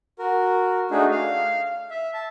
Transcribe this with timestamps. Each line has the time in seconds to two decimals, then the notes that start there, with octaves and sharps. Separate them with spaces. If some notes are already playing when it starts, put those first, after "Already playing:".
0.19 F#4 A#4
0.91 A3 D4 D#4 F#4 G#4
1.11 F5
1.90 E5
2.14 A5